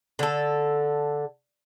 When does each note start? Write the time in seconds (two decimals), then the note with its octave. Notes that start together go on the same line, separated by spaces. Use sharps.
0.19 D3 A4